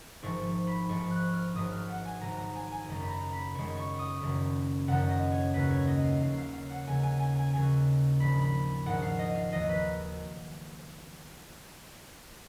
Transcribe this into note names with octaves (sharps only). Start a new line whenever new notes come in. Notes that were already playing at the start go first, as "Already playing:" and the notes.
G#1 G#2 F3 C#6
B5
G#1 G#2 F3 C#6
F#6
F6
G#1 G#2 F#3 D#6
F6
F#5
G#5
G#1 G#2 F#3 A#5
A#5
G#5
G#5
F#1 F#2 D#3 G#3 A#5
B5
A#5
B5
F#1 F#2 D#3 G#3 C#6
C#6
D#6
F#1 F#2 D#3
F#1 F#2 D#3 F#5
D#5
C#5
D#2 C#3 F#3 B4
C#5
D#5
F5
D#2 C#3 F#3 F5
F5
F5
F#5
D#2 C#3 F#3 G#5
G#5
G#5
G#5
D#2 C#3 F#3 G#5
A#1 G#2 D#3 B5
B5
A#1 G#2 D#3 F#5
F5
D#5
F5
D#2 D#3 F#3 D#5
B4